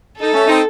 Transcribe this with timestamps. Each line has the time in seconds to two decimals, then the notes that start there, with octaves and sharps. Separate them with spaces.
0.18 D#4 A4
0.32 A3 C#4
0.47 C4 D#4